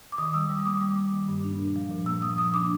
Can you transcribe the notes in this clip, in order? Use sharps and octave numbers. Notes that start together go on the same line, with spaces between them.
D6
D#3 D#6
G3 E6
G3 D#6
D#6
A#3 D6
G3 D6
A#3
D#3
G2
D4
A#2
F3
A#2
A#3 E6
F3 D#6
F3 D#6
D4 D6